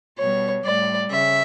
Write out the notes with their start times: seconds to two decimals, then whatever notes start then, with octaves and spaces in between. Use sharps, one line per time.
0.18 B2 G3 C#5
0.65 A2 G3 D5
1.11 C#3 E5